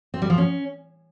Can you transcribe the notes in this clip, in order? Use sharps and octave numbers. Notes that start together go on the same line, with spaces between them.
C4
G3
F3
C#4